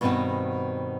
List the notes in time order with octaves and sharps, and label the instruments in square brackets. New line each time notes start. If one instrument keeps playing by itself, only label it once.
[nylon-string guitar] G2 B2 D#3 B3 C4 F#4